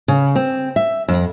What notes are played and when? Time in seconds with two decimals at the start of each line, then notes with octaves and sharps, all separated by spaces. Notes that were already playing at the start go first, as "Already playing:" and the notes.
0.08 C#3
0.36 C4
0.76 E5
1.08 F2